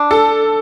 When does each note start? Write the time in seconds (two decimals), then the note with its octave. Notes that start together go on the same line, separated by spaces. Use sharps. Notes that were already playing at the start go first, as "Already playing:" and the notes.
Already playing: D4
0.11 A4